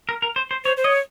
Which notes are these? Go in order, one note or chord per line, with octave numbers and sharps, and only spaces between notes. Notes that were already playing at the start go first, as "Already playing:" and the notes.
A#4
A#4
C5
C5
C5 C#5
C5
C#5 D#5